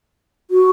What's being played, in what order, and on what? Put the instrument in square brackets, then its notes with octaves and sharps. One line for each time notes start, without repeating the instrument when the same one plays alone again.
[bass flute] F#4